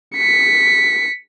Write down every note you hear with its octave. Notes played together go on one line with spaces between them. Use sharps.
B6 C#7